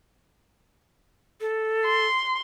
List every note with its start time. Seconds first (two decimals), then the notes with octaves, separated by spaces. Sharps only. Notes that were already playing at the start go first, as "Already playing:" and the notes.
1.41 A4
1.85 C6